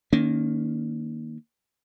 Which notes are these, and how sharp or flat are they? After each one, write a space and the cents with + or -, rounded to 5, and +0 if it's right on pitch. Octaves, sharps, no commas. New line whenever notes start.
D#3 -5 A#3 +0 C#4 +25